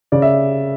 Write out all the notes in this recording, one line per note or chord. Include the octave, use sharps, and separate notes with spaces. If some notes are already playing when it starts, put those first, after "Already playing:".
C#3 D5
E5